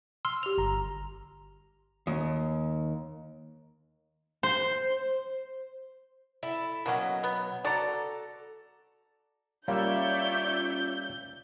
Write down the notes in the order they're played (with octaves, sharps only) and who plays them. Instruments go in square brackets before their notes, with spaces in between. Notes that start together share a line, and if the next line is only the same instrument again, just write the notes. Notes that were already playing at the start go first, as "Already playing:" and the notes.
[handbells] C6 E6 F6
[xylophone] G4 F7
[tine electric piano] G1 A#5
[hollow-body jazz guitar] D#2
[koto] C5
[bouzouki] E4 A4
[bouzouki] B2 F#3 [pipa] A#3 C#4
[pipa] B3
[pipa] F#4 D5 [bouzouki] A4 A#5
[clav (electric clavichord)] G3 A#3 [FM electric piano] C#4 F4 [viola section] C#5 D5 E5 [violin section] G6